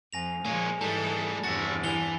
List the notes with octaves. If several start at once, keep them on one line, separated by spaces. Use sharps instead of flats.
F2 G#5 A#6 F7
A#2 F3 G#3 A#3 C#5 G#5
G#2 E3 G3 G#3 A4 A5
E2 G2 C3 F#4 E5 A6
E3 G#5 F7 G7